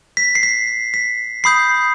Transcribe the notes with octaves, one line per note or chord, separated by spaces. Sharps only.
B6
C7
B6
B6
B5 D#6 G6 C7